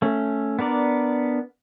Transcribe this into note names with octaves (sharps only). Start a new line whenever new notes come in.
A3 C#4
B3 D4 A#4 D5